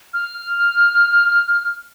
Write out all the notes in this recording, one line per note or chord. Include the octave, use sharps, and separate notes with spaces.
F6